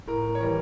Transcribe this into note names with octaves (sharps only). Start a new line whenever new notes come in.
A2 A#4
C#5
E3 G3 A#4